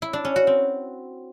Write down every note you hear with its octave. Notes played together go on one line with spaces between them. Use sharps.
E4
D4
C#4
F#4
C4